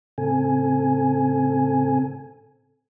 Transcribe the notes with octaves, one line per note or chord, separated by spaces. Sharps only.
A2 C#3 C4 A4 G#5